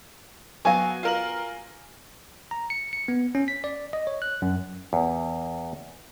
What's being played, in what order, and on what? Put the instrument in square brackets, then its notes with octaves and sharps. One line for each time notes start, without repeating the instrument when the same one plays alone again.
[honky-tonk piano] F#3 [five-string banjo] B3 F#4 F5 [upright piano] G#5
[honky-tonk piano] F4 A#4 F#7
[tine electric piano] A#5
C#7
C#7
B3
C#4
B6
D5
D#5
C#5
F#6
F#2
[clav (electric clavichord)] E2